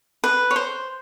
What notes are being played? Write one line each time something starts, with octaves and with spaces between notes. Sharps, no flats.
B4
C#5
C5